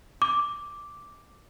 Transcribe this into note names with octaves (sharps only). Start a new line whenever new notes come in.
D6